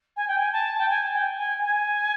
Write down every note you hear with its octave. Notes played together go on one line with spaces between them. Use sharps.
G#5
G5
G#5
A5
G5
G#5
G5
G#5
G#5